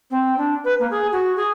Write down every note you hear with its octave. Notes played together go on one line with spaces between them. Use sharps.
C4
D4
B4
A#3
G#4
F#4
G#4